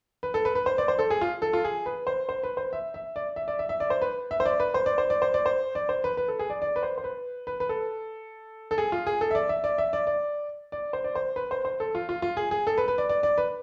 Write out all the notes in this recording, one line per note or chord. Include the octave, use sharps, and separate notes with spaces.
B4
A4
B4
B4
C5
D5
C5
A4
G#4
F4
A4
F4
G#4
B4
C5
C5
B4
C5
E5
E5
D5
E5
D5
E5
E5
D5
C5
B4
E5
C5
D5
B4
C5
D5
C5
D5
C5
D5
C5
D5
C5
B4
B4
A4
G#4
D5
D5
B4
C5
C5
B4
B4
B4
A4
A4
G#4
F4
G#4
A4
E5
D5
E5
D5
E5
D5
D5
D5
C5
D5
C5
B4
C5
C5
A4
F4
F4
F4
G#4
G#4
A4
B4
B4
D5
D5
D5
B4